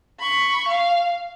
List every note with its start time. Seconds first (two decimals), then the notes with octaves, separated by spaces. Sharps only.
0.20 B5 C#6
0.68 F5